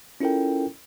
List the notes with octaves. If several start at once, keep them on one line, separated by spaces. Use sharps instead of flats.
C#4 E4 F4 A4 A#4 G5